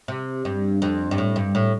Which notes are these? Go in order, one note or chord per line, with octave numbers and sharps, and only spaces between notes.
C3
G2
F2
G2
A2
G2
A2